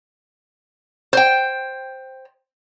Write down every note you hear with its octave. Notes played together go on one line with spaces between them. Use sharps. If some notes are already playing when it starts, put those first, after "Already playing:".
C5 G5